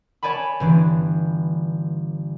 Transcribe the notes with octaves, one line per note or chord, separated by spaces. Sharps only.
C#5 D5 G#5 A5 B5
G1 E3 D4